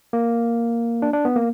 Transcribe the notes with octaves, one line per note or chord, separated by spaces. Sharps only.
A#3
D4
D4
B3
A#3